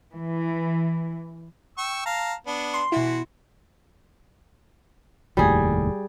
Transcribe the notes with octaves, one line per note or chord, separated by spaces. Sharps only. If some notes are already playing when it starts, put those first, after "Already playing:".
E3
G5 C#6 E6
F5 A5 A#5
B3 D4
C6
B2 E3 E4 F#4
F1 D#2 A2 G3 G#4